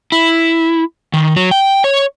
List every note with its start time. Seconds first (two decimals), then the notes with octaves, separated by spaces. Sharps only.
0.12 E4
1.14 D#3
1.36 F#3
1.51 G5
1.84 C#5